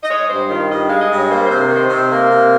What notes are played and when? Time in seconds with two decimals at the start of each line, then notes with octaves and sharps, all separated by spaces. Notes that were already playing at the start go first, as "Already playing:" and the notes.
0.03 D#5
0.10 G#3 C#5
0.29 G2 C5
0.49 D#3 F4
0.70 G2 D#5
0.85 G#3 F5
1.00 D#5
1.10 G2
1.15 C#5
1.30 A#3 C5
1.44 C5
1.50 C3
1.60 A#4
1.70 D#3 C5
1.89 C3 C5
2.10 A#3
2.30 C3